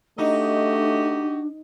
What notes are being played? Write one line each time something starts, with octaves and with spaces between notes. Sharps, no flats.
A3 D4 D#4 F#4 G4 D#5